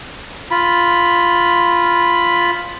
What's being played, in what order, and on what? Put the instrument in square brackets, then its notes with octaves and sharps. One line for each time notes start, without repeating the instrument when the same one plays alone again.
[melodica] F4 B5